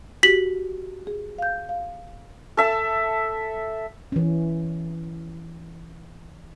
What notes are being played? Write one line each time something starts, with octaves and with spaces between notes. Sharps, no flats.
F#4 G4 B6 F#7
G#4
F5 G6
F5
A4 E5 A5
E3 C#4